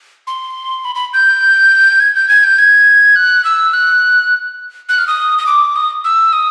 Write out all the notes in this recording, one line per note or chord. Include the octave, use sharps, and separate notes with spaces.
C6
B5
B5
G6
G#6
G6
G#6
G6
G#6
F#6
E6
F#6
F#6
F6
D#6
D#6
D6
D#6
E6
D#6